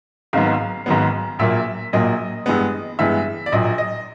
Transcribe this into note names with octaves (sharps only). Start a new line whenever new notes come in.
G#1 G#2 D#3 F#3 B3 F5
G#1 G#2 D#3 F#3 B3
A#1 A#2 F#3 A#3 E5
A#1 A#2 F#3 A#3 D#5
G2 E3 G#3 B3
G2 E3 G#3 B3 E5
D5
A#1 A#2 F#3 D#5
D#5